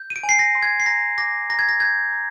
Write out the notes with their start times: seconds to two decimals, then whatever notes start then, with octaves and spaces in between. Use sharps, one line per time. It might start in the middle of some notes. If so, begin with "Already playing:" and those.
Already playing: G6
0.10 D#7
0.16 D7
0.23 G#5
0.29 C7
0.39 A#6
0.55 C6
0.63 G#6
0.80 C7
0.86 A#5 A#6
1.18 D6 A#6
1.50 A#5 A#6
1.59 G#6
1.69 A#6
1.80 G6 G#6
2.12 A#5